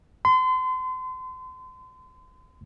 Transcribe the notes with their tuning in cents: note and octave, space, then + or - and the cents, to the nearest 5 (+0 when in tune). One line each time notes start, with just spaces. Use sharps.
C6 -35